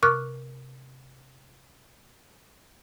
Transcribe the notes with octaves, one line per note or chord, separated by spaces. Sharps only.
C3 A#4 C#6 D6 F6 F#6